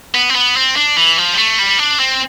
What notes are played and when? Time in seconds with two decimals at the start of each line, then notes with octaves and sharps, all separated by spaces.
0.14 B3
0.30 C4
0.35 B3
0.56 C4
0.76 D4
0.97 E3
1.18 F3
1.34 G3
1.38 A3
1.59 G3
1.79 D4
2.00 C4